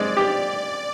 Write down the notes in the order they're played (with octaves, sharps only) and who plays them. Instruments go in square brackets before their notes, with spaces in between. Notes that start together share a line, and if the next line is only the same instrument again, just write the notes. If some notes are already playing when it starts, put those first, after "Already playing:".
Already playing: [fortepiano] G#3 C4 [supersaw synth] D5
[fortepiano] G4